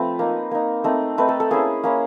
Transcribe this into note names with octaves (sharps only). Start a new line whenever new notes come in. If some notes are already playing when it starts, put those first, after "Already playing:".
Already playing: F3 A3 C4 B4
A#3 D#4
A#3 D#4
A3 C4 D#4
A3 C4 D#4 B4
A4
A4
A#3 C#4 E4 G#4
A#3 C#4 E4